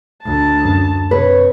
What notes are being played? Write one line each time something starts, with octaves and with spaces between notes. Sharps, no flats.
D2 A5
F#2
C3 B4 C#5